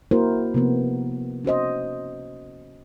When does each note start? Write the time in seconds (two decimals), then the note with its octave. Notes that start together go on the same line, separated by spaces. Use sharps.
0.11 A#3 E4 F#4 A#4 C5
0.54 C3 F3 A#3 B3
1.45 C#4 F#4 C5 D#5